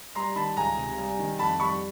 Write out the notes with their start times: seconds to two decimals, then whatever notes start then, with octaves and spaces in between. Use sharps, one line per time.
0.15 G3 A#5 C6
0.36 D#3 A5 B5
0.57 C#2 G#5 A#5
0.77 C3
0.98 G3
1.19 D#3
1.39 F2 A5 B5
1.60 G3 B5 C#6